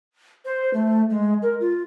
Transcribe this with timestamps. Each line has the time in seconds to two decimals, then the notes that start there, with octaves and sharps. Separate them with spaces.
0.45 C5
0.73 A3
1.10 G#3
1.42 A#4
1.60 F4